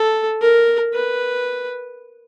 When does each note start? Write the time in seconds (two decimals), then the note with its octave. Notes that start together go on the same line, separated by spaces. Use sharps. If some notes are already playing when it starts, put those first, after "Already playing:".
Already playing: A4
0.41 A#4
0.94 B4